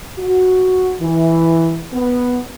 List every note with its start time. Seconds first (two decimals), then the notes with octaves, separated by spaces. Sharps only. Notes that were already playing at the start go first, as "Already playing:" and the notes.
0.18 F#4
1.01 E3
1.93 B3